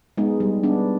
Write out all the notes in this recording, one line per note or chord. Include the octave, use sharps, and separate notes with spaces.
G#3 B3 D#4
G3
B3 D4